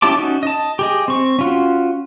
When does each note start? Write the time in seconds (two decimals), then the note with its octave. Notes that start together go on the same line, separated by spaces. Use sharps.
0.02 C#4 E4 G4 A5 D6
0.17 C#4 D#4 F#4
0.43 D#5 A5
0.79 G4 G#4 D#5
1.08 C4 C#6
1.39 C#4 F4 F#4